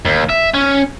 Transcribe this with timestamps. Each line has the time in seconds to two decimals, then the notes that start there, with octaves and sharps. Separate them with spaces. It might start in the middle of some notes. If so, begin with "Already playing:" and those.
0.05 D#2
0.29 E5
0.54 C#4